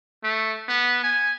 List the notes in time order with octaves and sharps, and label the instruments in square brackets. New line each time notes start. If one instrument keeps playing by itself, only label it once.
[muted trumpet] A3
B3
G#5